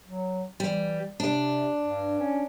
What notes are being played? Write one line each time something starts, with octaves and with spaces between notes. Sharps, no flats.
F#3
E3 G3
C3 D4
G2
C#4